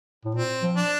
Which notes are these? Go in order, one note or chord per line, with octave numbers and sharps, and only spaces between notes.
A2
A#2 C4
F3
D4